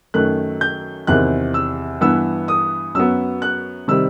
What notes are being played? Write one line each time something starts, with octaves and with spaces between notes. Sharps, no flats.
F#2 D#3 A3 F#6
G6
E2 C3 D#3 F#6
E6
G2 E3 B3 E6
D#6
F#2 F#3 B3 E6
F#6
C3 D#3 G3 E6